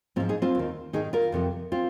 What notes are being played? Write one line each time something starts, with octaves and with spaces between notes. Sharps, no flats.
G#2 F3 C4 F4
D#4 G#4
C4 F4
D#2 D#3
G#2 D#3 D#4 G#4
F4 A#4
F2 C3 F3
C4 F4